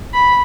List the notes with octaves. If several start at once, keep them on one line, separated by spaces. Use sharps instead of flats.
B5